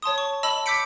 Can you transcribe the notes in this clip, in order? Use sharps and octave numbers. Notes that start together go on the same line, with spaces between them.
C#5 A5 C6 D#6
C#6
D#5 A5 B5 E6 F#7
D6 E6 G6 B6 C#7 D7